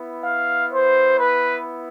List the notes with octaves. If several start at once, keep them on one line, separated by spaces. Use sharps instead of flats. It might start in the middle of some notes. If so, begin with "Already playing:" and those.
Already playing: B3 E4
F5
C5
B4